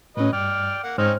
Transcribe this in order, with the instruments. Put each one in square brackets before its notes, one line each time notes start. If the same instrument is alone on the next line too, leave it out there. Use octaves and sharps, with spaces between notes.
[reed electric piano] A2 C#4 [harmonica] F#3 B4 D#5
[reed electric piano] G2 [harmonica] D5 G5 F6
[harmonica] A#3 F#5
[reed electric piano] G#2 C5 F6 [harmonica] C4 C#4 D#4